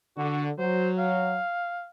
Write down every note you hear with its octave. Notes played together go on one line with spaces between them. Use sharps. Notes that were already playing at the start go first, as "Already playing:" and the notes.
D3 F#4
F#3 C5
F5